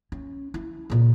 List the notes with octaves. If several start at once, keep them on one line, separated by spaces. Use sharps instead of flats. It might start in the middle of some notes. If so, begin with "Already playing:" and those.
C#4
E4
A#2 C#3